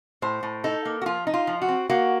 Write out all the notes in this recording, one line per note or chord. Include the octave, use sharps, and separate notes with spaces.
A2 C5
A2
D#4 A4
A#3
F#4
F3 F4
D#4
F4
F3
F#4
C4
A#3 F#4